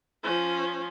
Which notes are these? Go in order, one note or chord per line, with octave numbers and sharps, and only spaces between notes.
F3 C#4